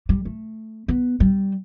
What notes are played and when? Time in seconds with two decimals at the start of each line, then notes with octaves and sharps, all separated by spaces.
0.09 G3
0.25 A3
0.88 B3
1.20 G3